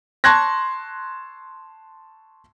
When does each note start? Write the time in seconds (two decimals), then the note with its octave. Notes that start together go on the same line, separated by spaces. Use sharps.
0.24 A5 C6 C#6 F#6 G#6 A#6